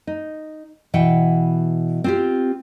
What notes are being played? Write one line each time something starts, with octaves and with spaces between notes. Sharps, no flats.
D#4
B2 E3 F#5 G5
C4 F4 G4